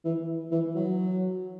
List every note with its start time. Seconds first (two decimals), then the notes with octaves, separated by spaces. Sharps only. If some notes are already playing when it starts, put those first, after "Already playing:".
0.04 E3
0.51 E3
0.75 F#3